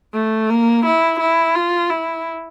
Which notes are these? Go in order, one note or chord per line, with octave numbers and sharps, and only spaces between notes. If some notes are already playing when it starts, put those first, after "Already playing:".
A3
A#3
E4
E4
F4
E4